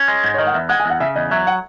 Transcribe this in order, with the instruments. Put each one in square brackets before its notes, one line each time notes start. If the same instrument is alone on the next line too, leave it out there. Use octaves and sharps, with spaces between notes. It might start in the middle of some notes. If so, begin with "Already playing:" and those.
Already playing: [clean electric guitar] C#4
G#3
G#2
[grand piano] C#5
[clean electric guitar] D#3 [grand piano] D#5
[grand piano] F#5
[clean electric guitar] E2 [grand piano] E5
[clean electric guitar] G#3 [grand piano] F#5
[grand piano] G#5
[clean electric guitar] E2
[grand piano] F#5
[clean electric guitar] C#3 [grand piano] E5
[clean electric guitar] E2 [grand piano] D#5
[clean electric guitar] F#3 [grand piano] E5
[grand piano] F#5